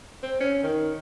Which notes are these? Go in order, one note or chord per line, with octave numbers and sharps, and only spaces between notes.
C4
C#4
D#3